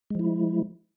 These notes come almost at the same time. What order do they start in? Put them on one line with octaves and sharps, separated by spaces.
G#3 F3 E4